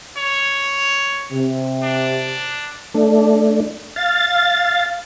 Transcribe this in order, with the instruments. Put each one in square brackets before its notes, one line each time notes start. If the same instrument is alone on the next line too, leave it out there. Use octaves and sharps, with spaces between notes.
[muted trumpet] C#5
[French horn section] C3
[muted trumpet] D4
[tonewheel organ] A3 D4
F5 A6